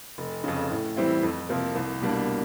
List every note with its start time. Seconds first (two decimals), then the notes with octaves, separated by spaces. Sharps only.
0.18 F1
0.44 F2 C#3
0.70 A2
0.97 E3 G3 C4 E4
1.23 F2
1.49 C3 F3 A#3
1.75 C2
2.01 B2 G3 A#3 D4